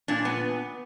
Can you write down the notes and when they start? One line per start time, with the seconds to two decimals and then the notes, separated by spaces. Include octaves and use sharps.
0.08 A#2 D4
0.25 B3